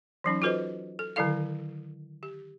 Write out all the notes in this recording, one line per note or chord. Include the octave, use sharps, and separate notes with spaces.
E3 F#3 C#4 D#4
F4 F#4 A4 B4 C5 D#5
A4
D3 D#3 F#3 E4 A4 F5
G4